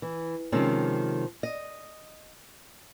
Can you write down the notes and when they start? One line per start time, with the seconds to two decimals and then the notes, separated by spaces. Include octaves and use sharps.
0.02 E3
0.52 C3 D#3 F3 G#3 C4 C#4
1.43 D#5